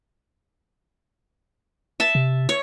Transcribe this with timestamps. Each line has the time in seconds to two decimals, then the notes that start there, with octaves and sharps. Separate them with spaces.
2.00 E5 A5
2.15 C3
2.49 C#5